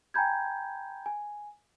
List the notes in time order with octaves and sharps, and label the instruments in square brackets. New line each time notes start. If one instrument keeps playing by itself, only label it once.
[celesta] G5 G#5 A#5 B5 G6 G#6
G#5